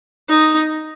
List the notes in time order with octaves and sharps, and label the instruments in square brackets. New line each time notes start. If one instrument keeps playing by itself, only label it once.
[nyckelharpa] D#4